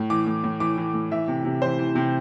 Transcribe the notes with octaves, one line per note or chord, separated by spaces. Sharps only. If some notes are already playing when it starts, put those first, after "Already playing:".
Already playing: A2
E3 D6
A2
A2
E3 D6
E3
A2
E3 E5
C3
C3
E3 C5
E3
C3